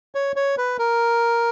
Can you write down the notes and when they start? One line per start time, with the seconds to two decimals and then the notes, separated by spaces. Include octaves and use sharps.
0.15 C#5
0.36 C#5
0.58 B4
0.79 A#4